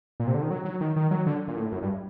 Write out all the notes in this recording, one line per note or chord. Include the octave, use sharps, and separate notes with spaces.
A#2
C3
D3
D#3
F#3
F#3
D#3
D#3
F#3
D3
A#2
A2
F#2
G2